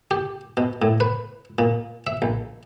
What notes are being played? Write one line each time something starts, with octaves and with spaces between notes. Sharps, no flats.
G4
B2
A2
B4
A#2
E5
A#1